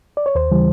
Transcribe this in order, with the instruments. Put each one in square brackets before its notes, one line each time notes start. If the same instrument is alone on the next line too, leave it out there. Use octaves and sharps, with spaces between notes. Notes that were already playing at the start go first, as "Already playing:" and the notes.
[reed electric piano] D5
C#5
D#2 C5
C#3 E3 G3